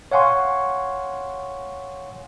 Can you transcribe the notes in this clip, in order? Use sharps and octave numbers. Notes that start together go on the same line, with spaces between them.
C#5 F5 F#5 G#5 C6 C#6